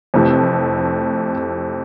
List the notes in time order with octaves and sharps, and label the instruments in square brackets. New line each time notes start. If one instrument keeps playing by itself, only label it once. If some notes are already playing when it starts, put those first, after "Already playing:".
[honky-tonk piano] F2 C3 E3 A3